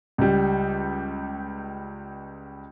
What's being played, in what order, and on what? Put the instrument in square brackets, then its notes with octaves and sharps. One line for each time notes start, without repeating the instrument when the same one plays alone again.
[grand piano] C#2 G3